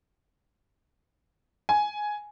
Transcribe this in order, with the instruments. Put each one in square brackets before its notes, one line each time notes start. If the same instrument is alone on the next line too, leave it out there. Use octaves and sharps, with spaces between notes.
[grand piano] G#5